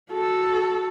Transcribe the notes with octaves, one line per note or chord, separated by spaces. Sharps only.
F#4 A4